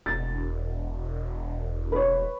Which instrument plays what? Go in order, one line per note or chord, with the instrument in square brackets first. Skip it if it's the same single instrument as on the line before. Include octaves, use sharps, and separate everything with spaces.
[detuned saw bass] E1 [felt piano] A6
[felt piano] B4 C#5